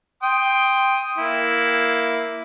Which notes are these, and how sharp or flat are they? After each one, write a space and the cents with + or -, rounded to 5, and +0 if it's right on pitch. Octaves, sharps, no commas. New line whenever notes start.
G5 +5 C6 +0 D#6 +0
A#3 +0 E4 +0